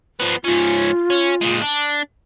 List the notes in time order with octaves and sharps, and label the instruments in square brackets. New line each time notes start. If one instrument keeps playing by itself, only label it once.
[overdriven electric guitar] F3 B3
[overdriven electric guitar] G#2 C#4 [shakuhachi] F4
[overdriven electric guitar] C#4
A#2 G#3
D4